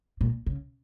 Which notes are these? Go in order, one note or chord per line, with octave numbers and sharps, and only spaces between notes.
A#2
C#3